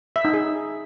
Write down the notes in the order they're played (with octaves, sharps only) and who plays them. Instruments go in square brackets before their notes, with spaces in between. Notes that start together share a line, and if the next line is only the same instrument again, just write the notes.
[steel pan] E5
D#4
G#4